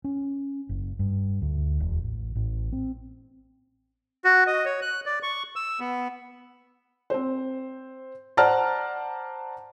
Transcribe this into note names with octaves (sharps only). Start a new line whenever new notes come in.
C#4
F#1
G2
D2
E1
A1
A1
C4
F#4
D#5
C#5
F#6
D5
C#6
E6
B3
C4 C5
C5 D5 F#5 A5 A#5 F6